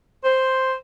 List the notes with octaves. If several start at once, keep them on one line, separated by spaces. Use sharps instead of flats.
C5